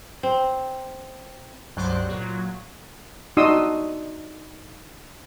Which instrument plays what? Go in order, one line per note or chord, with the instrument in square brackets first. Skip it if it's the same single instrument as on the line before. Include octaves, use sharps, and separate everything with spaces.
[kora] C4
[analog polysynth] C#2 G2 F#3 C5 D5 F#6
A#2 F#3
[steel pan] D4 D#4 F#4 C6 D#6 E6